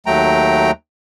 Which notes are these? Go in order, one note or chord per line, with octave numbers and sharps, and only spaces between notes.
D#2 F#3 A3 G5 A#5